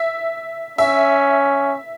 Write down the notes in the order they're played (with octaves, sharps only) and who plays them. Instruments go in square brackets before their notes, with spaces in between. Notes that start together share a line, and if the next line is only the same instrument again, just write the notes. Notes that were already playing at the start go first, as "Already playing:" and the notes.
Already playing: [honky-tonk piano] E5
[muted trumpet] C#4 [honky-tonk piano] E5